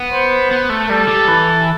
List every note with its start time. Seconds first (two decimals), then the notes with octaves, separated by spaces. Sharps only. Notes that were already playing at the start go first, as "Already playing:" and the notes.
Already playing: B3
0.12 C5
0.51 B3
0.69 A3
0.89 G3 A4
1.08 G3
1.28 E3